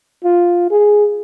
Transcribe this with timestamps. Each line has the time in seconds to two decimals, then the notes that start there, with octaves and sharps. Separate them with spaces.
0.25 F4
0.71 G#4